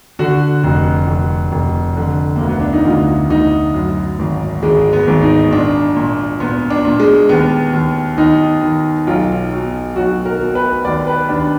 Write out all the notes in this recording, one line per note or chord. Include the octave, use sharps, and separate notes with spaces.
D3 F#4
F1
F1
F1
D3
D2 A#3
B3
D4
D#4
D2 F4
D2 D#4
F#2
G#1
G#1 G#3
B3
G#1
D#4
A#2 D4
A#2
A#2 B3
D4
A#2
G#3
D#2 B3
D#2
D#2 D#4
D#3
B1 F4
B2
B1 F#4
A#4
B2
B4
D#2 D5
B4
D#2 D4